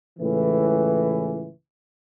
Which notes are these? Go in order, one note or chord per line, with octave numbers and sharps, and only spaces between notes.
C#2 A2 E3